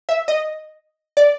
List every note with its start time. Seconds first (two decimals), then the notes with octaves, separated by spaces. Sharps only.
0.09 E5
0.28 D#5
1.17 D5